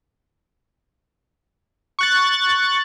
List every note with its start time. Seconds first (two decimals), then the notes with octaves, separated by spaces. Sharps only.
1.99 C#6 F#6 A6